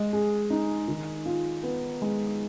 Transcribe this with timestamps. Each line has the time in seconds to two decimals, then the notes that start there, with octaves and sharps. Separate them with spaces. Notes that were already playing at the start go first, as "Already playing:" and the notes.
Already playing: G#3 D#5
0.13 G#4
0.50 D#4
0.88 D#3
1.26 F4
1.63 B3
2.02 G#3